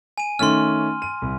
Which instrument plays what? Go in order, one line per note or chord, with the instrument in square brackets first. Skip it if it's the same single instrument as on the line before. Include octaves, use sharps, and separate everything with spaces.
[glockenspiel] G#5 D#7
[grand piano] D#3 A3 C#4 [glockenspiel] C6 F6
[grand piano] D#7
C2